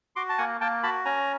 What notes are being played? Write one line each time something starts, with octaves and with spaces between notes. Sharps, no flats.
F#4 C6 D6
A5
A#3 F#5 G#5
A#3 G5 A5
F#4 A5 B5
C#4 G#5 A#5